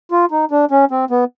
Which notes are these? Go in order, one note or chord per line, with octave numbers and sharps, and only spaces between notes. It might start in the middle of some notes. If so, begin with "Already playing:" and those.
F4
D#4
D4
C#4
C4
B3